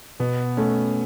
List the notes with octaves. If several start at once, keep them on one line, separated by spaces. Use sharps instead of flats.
B2 B3
A3 C#4